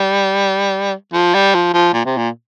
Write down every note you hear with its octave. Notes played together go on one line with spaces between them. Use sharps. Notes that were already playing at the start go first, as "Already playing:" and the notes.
Already playing: G3
F3
G3
F3
F3
A#2
C3
A#2